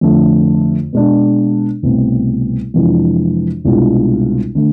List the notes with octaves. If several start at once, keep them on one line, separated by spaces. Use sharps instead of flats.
F2 D3 A3
B2 G#3 D4
C2 B2 A3 C4
F2 C3 E3 G#3 D4
C2 B2 G#3 D4 F4
D3 A3